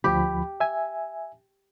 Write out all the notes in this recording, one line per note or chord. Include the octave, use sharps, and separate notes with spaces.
D2 F3 G4 B5
E5 G#5